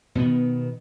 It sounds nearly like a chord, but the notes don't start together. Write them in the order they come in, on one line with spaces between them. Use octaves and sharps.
B2 B3 D#3